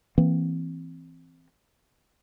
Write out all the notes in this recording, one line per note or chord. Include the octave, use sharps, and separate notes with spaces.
E3 A#3 C4